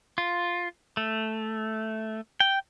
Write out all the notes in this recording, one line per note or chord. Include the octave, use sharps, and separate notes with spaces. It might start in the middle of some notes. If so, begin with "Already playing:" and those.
F4
A3
G5